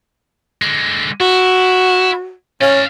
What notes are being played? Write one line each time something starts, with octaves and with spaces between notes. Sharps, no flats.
D3 G#3
E4 F#4
C#4 D5 F5